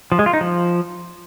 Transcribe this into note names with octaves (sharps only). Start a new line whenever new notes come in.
F3
G#3
F4
D#4
F3